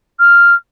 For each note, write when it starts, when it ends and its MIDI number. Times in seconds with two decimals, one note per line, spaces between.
0.19 0.54 89